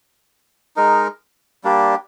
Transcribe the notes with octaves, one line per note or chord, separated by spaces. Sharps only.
G#3 D#4 A#4
G3 A#3 D4 G4